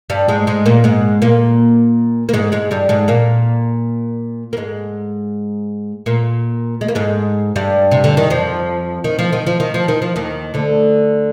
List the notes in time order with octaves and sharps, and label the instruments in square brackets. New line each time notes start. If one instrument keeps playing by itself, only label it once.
[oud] G2 G3
G#2 G#3
G#2 G#3
A#2 A#3
G#2 G#3
A#2 A#3
A#3
G#2 G#3
G#2 G#3
G2 G3
G#2 G#3
A#2 A#3
A#3
G#2 G#3
A#2 A#3
G#3
A#3
G#2 G#3
G2 G3
C3
D3
D#3
F2 F3
D#3
F3
D#3
F3
D#3
F3
D#3
F3
D#2 D#3
D2 D3